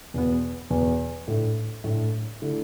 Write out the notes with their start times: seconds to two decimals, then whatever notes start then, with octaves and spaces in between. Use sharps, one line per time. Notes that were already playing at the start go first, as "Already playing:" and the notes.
0.14 E2 B2 B3
0.70 E2 B2 B3
1.28 A2 A3 D4
1.84 A2 A3 D4
2.42 D3 A3 E4